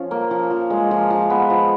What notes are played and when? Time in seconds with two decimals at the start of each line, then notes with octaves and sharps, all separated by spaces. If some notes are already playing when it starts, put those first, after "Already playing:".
Already playing: F3 C#4 F4
0.11 A#3
0.31 F3
0.51 F3
0.70 G#3
0.91 F3
1.10 F3
1.30 B3
1.50 F3